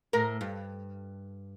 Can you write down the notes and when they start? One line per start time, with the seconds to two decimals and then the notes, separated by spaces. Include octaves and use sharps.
0.13 A2 A#4
0.41 G2